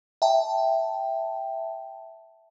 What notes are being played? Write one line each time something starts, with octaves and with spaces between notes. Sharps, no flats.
E5 G5 A5